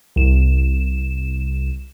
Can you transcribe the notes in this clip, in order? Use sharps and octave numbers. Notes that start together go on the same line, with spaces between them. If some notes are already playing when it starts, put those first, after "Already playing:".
C2 E7